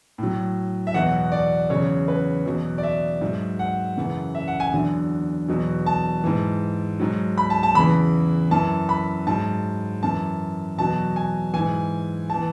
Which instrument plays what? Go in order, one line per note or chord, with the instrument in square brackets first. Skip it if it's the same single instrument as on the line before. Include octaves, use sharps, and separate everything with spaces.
[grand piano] A2 F#3
E5
E2 B2 F#3 F#5
D5
E2 C#3 F#3 C#5
B4
E2 B2 F#3
D5
E5
G#2 F#3
F#5
F#2 C#3 E3
E5
F#5
G#5
E2 D3 F#3
E2 B2 F#3
A5
G#2 E3
G#2 F#3
B5
A5
A5
E2 C#3 E3 B5
F#2 E3 A5
B5
G#2 F#3 A5
F#2 E3 A5
E2 B2 F#3 A5
G#5
G#2 E3 G#5
E3 A5